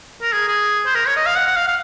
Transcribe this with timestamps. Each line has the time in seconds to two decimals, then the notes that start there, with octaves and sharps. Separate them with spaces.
0.22 A#4
0.33 G#4
0.48 G#4
0.86 C5
0.95 A#4
1.06 C#5
1.16 D#5
1.26 F5
1.37 F#5
1.47 F#5
1.57 F5
1.68 F5